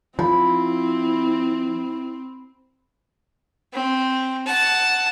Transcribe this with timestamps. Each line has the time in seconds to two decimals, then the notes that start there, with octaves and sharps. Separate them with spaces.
0.19 F3 C4 E4 B5
3.73 C4
4.47 F#5 A5